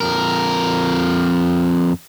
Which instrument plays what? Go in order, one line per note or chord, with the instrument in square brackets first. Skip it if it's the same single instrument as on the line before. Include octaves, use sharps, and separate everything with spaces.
[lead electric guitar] F2 A#4